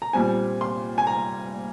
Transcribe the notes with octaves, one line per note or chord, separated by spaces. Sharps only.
A#5
A#2 G3 C4 G#5
C6
G#5
A#5